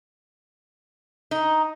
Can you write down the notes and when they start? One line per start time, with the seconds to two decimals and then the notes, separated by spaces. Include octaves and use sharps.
1.31 D#4